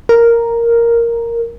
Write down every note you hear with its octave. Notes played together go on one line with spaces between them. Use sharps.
A#4